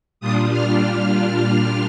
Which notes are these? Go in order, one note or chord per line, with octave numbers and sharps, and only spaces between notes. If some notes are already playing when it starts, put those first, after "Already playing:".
A#2 G3 D4 F4 D#6
F6
F6